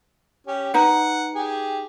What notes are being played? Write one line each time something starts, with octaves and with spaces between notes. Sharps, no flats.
C#4 G4
D#4 B4 F#5
G4 G#4